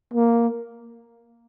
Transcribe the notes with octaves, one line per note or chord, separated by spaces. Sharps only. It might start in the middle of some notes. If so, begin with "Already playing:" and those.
A#3